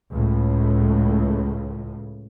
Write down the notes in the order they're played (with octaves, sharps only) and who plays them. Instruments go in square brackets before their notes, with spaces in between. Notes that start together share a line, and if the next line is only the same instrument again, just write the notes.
[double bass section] C#2 A2